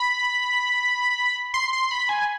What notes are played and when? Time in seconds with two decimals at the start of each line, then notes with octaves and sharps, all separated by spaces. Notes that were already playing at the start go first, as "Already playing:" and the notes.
Already playing: B5
1.54 C6
1.73 C6
1.91 B5
2.09 G#5